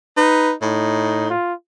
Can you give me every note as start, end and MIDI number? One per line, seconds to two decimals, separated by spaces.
0.17 0.53 63
0.17 0.53 71
0.62 1.32 45
0.62 1.28 63
1.30 1.54 65